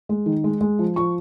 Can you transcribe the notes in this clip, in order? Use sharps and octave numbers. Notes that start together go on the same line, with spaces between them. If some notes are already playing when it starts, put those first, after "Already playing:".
G#3
D#3
G#3
G#3
F3
F3 C#6